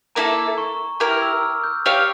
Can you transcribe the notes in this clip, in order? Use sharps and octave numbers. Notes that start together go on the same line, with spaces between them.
A#3 E4 A4 A#5
C#6
E4 G4 A#4 D6
F6
E6
F6
G6
G4 C#5 F5 F6